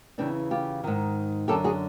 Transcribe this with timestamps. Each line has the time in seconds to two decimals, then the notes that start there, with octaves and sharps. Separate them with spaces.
0.18 E2 C#3 E3 C4 D4
0.51 F4 G4
0.84 G#2 D#3
1.48 F#2 D3 G4 A4
1.64 F#4 G#4